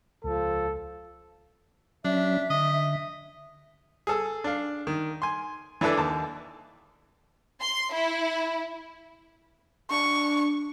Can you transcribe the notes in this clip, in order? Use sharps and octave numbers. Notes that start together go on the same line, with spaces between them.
C#2 F3 A4
F#3 C#4 D4 E5
D3 D#5
G#4 A4 E6
D4 F5
D#3
G#5 C6
E3 D4 E4 A4 B4 D5
D#2 A5 D6
C6
E4
D4 C#6